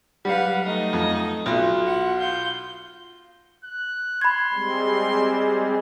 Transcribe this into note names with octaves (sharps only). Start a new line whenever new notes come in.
F#3 G3 B4 F5 F#5
A3 D#4 D#5
F2
B1 F4 F#4 C6
F#5
F4 G6
F#6
B5 C6 G#6
G3 G#3 C4